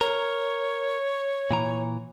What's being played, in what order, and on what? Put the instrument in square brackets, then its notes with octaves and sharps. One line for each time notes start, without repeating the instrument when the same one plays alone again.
[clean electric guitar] A#4 [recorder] C#5
[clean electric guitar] A#2 E3 A#5